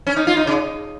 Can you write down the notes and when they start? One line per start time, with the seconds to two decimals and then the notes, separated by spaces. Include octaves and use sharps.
0.07 C#4
0.16 D#4
0.27 F4
0.37 D#4
0.47 C#3